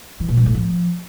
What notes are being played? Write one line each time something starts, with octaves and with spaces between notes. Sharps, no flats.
E3
A#2
G2
A2
F3